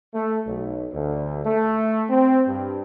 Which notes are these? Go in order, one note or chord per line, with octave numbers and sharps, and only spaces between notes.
A3
B1
D2
A3
C4
G2